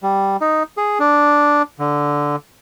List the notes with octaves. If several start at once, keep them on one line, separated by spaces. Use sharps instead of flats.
G3
D#4
G#4
D4
D3